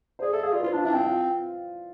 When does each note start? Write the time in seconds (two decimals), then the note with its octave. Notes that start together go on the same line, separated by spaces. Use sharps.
0.19 C5
0.22 G#4 D5
0.33 A4 E5
0.43 G#4 F5
0.53 F4 D5
0.59 B4
0.63 F4 C5
0.73 D4 F4
0.84 D4 E4
0.93 C4 F4
1.04 F4